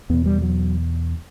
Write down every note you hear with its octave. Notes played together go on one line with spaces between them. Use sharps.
E2 B2 B3
G3
F#3